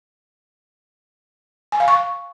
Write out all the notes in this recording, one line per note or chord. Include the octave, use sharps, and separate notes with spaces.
G#5
F5
C#6